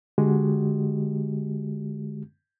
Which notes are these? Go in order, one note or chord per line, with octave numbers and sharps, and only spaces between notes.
D3 G#3 F#4 G4